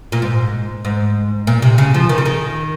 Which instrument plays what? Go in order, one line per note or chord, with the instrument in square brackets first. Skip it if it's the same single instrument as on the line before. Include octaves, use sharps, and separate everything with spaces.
[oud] A#2
G#2
G#2
A#2
C3
C#3
F3
D#3
C#3
D#3